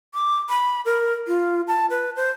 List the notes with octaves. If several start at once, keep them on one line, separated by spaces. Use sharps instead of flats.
D6
B5
A#4
F4
A5
B4
C5